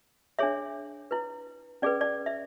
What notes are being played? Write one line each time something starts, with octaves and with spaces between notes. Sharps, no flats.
D4 G#4 C#5 E5
E4 B4
C#4 G#4 B4 D5
D5
E5